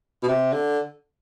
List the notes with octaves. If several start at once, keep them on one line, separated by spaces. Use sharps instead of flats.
B2
C3
D3